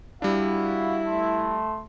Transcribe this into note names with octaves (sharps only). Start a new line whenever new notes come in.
G3 D4 E4 F#4 F5
A3 A5 C6